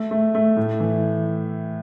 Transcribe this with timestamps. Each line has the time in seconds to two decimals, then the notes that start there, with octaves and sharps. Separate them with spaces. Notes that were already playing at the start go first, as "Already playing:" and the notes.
Already playing: A3
0.11 A3
0.35 A3
0.56 A2
0.80 E3